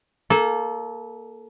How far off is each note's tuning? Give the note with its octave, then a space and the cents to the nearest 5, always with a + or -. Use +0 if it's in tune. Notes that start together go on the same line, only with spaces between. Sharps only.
A#3 +0 A4 -25